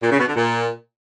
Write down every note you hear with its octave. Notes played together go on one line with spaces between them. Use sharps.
A#2
C#3
B2
D3
A#2